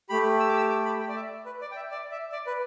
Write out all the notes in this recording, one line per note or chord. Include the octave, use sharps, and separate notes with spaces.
A3 G4 B5
E6
D6
E6
D6
B5
G5
D5
E5
B4
D5
G5
E5
D5
E5
D5
B4